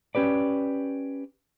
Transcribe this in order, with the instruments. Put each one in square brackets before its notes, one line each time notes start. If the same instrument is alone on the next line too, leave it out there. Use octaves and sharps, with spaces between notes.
[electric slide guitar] C#4 G4 B4 D5